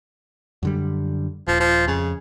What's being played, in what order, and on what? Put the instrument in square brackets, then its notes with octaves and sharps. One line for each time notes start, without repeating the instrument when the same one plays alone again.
[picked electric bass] F#2 D3 G3
[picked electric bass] D#1 [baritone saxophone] F3
[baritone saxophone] F3
[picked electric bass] F2 [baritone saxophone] C#3